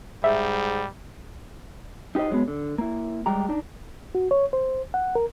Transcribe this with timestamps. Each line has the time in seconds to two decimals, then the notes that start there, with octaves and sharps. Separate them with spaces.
0.24 G#2 G3 E5
2.15 D#4 G4 G#4 C5 D#5
2.30 F#3 G#3 A#3 B3
2.48 D3
2.78 A#3 E4
3.26 G3 G#3 G4 A#5
3.49 D4 D#4
4.15 F#4
4.31 C#5
4.53 C5
4.94 F#5
5.15 A#4